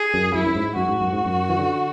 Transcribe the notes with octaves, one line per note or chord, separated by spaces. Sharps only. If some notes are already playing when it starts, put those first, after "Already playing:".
Already playing: G#4
F#2
F#2 E4
F#2
G#2
F#2 F#4
G#2
F#2
G#2
F#2
E3
D3